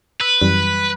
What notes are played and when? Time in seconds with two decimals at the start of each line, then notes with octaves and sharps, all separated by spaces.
0.21 B4 E6
0.41 F#2 E3 G3